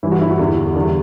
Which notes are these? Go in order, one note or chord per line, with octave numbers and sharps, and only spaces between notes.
G2 E3 G3 E4
F#4
E4
F#4
E2 D3 G3
E2 D3 G3